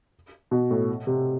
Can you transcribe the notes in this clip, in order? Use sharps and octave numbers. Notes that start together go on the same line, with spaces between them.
B2
A2
C3